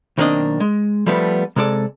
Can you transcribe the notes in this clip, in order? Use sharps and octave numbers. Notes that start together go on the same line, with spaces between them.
B1 D#3 A#3 C4 D4 D#5
G#3
F3 G3 A3 B3
C3 G#3 A4 D5